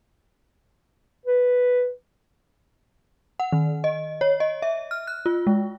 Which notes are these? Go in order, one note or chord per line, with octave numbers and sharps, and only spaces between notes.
B4
F#5
D#3
D#5
C#5
D#5
E5
F6
F#6
F4
G#3